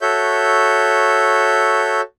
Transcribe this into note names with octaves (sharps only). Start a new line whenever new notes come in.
F#4 A4 C#5 E5 G6